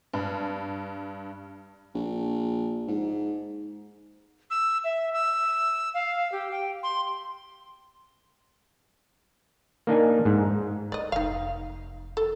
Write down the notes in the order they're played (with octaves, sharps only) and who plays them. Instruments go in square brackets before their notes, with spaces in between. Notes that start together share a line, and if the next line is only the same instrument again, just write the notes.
[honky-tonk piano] G2
[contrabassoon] A#1
G#2
[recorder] E6
E5
E6
F5
G4
G5
C6
[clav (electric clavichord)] A#3 D4 D#4 G#5
G#2
[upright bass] G#2 [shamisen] D5 D#5
[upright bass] F1 F3 [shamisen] D#4 F5
[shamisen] A4